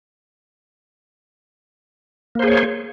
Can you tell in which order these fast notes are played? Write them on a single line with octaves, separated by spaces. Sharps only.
A#3 C5 G#4 C#5